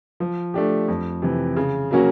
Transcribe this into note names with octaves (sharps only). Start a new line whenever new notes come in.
F3
A3 D4 G4
F2
C3 E3
C#3
F#3 A#3 C#4 F#4